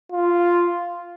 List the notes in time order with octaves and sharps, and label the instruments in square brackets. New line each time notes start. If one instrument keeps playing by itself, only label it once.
[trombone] F4